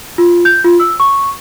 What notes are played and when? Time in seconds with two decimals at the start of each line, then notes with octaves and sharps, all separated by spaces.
0.18 F4
0.45 G6
0.64 F4
0.80 E6
1.00 C#6